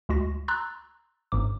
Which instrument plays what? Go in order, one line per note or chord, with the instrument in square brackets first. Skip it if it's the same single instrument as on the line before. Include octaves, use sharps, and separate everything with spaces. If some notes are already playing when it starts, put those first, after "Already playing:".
[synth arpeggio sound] D2 G#3 F#4 A#6
A#5 C6 E6 F#6 A6
G1 G#2 D6